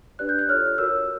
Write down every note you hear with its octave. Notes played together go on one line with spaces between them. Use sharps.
D4 G4 B4 D5 F#6
G6
F#6
F4 A4 C#5 F6
F#4 A#4 C#5 E6